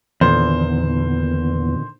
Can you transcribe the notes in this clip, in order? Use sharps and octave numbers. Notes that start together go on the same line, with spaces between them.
E2 A#2 D3 D#3 C5